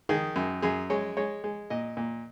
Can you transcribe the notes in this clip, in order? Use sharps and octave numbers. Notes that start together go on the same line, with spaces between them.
D#3 G#4
F#2
F#2 G#4
G#3 C#5
G#3 C#5
G#3
A#2 D#5
A#2